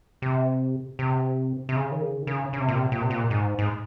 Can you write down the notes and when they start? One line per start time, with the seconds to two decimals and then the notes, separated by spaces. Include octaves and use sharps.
0.22 C3
0.99 C3
1.69 C3
1.76 C#3
1.92 D#3
2.01 C#3
2.22 D#3
2.27 C#3
2.53 C#3
2.60 C3
2.68 A#2
2.75 C3
2.92 A#2
3.02 C3
3.10 A#2
3.30 G#2
3.59 G#2